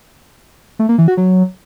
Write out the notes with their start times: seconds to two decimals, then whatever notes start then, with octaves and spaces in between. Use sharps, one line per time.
0.79 A3
0.89 A#3
0.98 E3
1.08 F#4
1.17 F#3